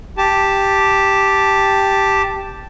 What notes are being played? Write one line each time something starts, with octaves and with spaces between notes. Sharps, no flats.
G4 A5